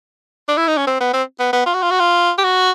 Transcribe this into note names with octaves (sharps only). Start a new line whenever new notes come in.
D4
E4
D#4
C#4
C4
B3
C4
B3
B3
F4
F#4
F4
F#4
F4
G4
F#4